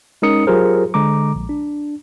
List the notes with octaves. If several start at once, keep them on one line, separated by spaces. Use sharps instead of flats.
G#3 C#4 D#4 A#4 D#6 C#7
F#3 F4 G4 G#4 A#4 C5
D3 G#3 A#5 D6
A#1
D4